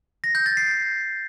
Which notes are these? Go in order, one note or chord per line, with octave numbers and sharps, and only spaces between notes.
A#6
G6
A6
C7